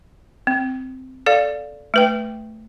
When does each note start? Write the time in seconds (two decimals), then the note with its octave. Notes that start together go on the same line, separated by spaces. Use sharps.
0.47 C4
1.26 A4 D5 F5
1.94 A3 B4 G5